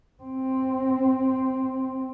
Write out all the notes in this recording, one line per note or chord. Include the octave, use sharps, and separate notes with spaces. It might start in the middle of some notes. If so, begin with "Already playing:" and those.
C4